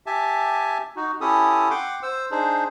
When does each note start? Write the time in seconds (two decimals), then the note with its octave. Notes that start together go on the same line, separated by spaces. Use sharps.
0.06 G4 E5 G#5 A5
0.96 D#4 F#4
1.21 C#4 E4 G4 A4 D#6
1.70 F#5 G5 C6 D6
2.03 C5 E6
2.31 D4 D#4 G#4 C5